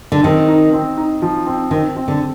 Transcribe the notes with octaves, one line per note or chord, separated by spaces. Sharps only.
D3
D#3 C4
D#4
C4
D#4
F3
C4
D#3 C4
C4
D3